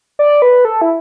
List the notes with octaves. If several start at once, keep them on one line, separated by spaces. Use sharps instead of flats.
D5
B4
A4
E4